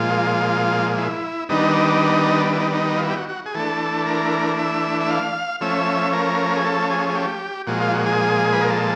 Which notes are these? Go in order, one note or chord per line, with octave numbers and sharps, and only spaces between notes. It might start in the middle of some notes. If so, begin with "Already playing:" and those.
Already playing: A#2 F3 G#3 F4
E4
D#3 G3 B3 D4 D#4
E4
D#4
D4
D#4
F4
E4
G4
F#4
F#4
G#4
E3 A3 D4 A4
A#4
E5
E5
F5
F3 A3 C#4 E5
A#4
G#4
A4
G#4
G#4
G4
A#2 F3 G#3 F#4
F4
F#4
G#4
B4
A#4
A4